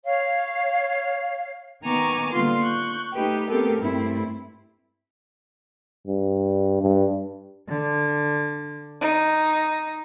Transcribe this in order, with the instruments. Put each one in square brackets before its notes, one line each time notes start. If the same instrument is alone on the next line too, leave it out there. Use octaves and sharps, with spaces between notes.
[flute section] C#5 F5
[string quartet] D#3 B3 G#5 A#5 C#6 D6
D3 G3 A#3 B3 F4 C6
C#6 F#6 G6
A3 D#4 G4 B4 G5
A3 B3 C4 G4 A4 A#4
G2 G3 A3 C4 E4
[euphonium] G2
G2
[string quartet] D3
D#4